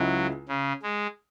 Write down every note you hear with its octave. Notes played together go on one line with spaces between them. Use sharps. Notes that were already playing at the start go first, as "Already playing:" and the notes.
Already playing: C#2 C#3 F#3 G#3 E4
C#3
G#3